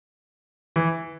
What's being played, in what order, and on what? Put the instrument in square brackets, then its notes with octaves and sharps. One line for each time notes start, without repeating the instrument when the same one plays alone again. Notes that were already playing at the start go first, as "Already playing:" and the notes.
[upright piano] E3